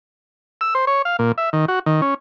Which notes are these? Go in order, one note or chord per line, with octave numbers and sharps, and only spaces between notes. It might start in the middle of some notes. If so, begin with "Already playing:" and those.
E6
C5
C#5
F5
A#2
E5
D#3
F#4
D#3
C#4